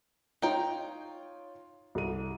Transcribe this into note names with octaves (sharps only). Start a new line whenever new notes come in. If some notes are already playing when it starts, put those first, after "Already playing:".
D#4 F4 C#5 G5
C2 A4 D#7